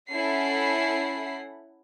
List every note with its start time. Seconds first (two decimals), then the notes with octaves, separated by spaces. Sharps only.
0.11 C#4 E4 A4 F#5 B5 C7